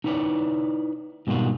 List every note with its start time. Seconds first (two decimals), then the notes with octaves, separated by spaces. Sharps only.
0.04 D#4 E4 B4 C#5 D5
1.27 G#2 B2 D#3 G3 F4 F#4